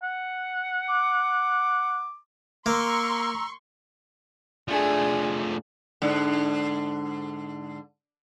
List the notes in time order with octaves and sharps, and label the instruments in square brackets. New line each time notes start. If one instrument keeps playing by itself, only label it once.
[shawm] F#5
[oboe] D6
[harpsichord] A#3 [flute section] A#5 E6 [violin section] C6 C#6
[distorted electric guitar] F3 A3 [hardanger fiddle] D4 G#4
[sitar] G#2 D3